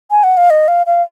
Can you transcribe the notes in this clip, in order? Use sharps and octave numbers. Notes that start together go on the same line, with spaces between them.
G#5
F#5
F5
D#5
F5
F5